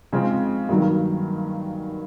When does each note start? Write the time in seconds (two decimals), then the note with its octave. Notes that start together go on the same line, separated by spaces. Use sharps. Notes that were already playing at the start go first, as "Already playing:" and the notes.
0.13 C#3 F3 G#3 C4
0.69 G2 D#3 F#3 A#3